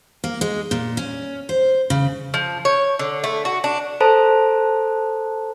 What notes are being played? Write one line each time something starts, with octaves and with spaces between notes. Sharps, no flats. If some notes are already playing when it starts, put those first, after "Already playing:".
A#3
G#3
A#2
C#4
C5
C#3
F3
C#5
D3
A3
F#4
D4
A4 C5 A5 A#5